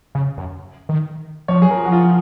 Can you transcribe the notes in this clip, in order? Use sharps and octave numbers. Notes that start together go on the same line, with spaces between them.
C#3
F#2
D#3
F3 C#5
F#3 G#4
F3 A#4
F#4
F4